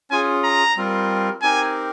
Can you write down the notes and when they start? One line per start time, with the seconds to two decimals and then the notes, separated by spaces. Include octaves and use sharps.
0.10 C#4 F4 G#4 G#5
0.44 A#5
0.76 G3 C4 F4 A#4
1.42 C4 D#4 G4 A#4 G#5